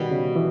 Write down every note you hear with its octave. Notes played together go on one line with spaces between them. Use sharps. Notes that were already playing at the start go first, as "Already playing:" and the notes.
Already playing: B2 D#3 G3 B3
C#3
E3